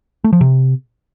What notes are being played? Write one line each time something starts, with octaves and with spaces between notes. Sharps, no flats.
A3
F3
C3